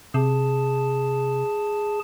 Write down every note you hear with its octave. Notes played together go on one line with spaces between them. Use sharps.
C3 G#4 A5